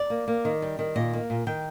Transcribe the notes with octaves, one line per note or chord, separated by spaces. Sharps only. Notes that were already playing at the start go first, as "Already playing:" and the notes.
Already playing: D5
A#3
A#3
D#3
G3
D#3
A#2 D#5
A#3
A#2
D#3 G5